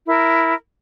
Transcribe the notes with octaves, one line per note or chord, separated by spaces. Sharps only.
E4 A#4